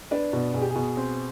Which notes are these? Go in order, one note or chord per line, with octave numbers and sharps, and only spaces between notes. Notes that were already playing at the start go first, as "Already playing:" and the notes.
D4 B4
B2
B2 G#4
G4
G#4
B2
C4